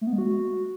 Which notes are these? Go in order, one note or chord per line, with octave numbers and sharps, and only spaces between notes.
A3
B3
G#3
F#4